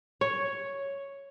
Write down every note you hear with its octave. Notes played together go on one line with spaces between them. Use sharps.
C#5